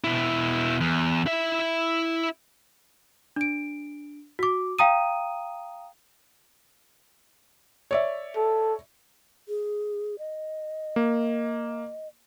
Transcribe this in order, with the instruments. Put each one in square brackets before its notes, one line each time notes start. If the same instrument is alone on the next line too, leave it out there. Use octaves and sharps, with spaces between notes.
[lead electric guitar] B2 E4
E2
E4 E5
[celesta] D4 D7
F#4 D6
F5 G5 A#5 D#6 D#7
[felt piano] C#5 D5 E5
[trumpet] A4
[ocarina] G#4
D#5
[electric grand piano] A#3